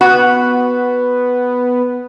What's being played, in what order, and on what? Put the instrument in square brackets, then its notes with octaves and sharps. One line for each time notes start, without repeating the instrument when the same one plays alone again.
[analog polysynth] B3 [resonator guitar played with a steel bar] F#4